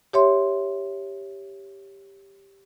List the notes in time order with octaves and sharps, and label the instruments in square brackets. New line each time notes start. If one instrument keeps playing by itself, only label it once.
[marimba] G4 C#5 E5 C6